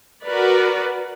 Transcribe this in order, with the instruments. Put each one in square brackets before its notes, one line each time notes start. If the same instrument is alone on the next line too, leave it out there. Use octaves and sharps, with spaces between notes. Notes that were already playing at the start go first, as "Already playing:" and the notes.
[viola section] F#4 A#4 B4 D5